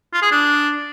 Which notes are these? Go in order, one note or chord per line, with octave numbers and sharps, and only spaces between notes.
F4
G#4
D4